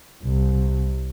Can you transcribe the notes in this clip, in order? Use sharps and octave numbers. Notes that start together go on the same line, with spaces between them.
C2